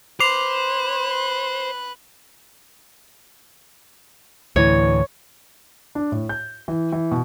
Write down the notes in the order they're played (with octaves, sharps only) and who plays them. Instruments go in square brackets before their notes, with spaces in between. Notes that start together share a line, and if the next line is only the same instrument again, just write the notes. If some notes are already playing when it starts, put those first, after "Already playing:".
[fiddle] B4 F#6 [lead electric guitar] C5 [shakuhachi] C6 [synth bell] D6 C7 F7
[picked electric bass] D2 A2 E3 [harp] C#5
[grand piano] D4
A2
G6
E3
E3
B2